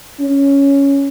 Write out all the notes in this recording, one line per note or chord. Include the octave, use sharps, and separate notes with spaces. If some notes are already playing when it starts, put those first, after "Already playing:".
C#4